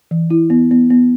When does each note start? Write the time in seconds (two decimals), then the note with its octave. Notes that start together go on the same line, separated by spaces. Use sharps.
0.11 E3
0.30 E4
0.50 B3
0.71 B3
0.90 B3